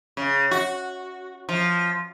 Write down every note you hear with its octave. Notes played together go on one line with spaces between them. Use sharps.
C#3
F#4
F3